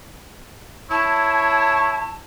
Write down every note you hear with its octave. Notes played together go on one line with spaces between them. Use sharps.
E4 C#5 A5